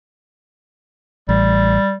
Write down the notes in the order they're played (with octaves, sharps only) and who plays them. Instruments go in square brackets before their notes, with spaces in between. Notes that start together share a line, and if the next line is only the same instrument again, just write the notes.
[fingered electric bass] A1 [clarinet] G3